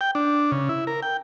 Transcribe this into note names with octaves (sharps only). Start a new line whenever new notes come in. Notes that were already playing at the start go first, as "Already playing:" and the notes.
G5
D4
C#3
E4
A#4
G5